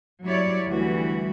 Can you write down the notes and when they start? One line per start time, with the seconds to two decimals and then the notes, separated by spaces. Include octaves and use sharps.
0.24 F#3 G3 E4 C#5 D5
0.67 D2 E3 G3 F#4